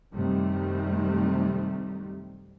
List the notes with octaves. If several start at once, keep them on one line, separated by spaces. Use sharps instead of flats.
F#2 C3 D#3 G3 A3